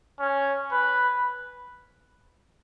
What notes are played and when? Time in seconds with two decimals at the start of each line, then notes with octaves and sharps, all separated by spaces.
0.20 C#4
0.71 B4